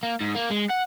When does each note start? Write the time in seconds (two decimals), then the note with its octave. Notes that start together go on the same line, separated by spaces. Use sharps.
0.03 A#3
0.21 G#2
0.35 A#3
0.51 G#3
0.70 F#5